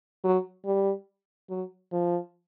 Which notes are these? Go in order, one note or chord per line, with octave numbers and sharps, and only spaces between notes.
F#3
G3
F#3
F3